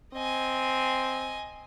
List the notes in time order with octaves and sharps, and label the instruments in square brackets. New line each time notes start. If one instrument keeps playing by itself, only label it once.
[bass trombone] C4 [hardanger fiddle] D#5 G#5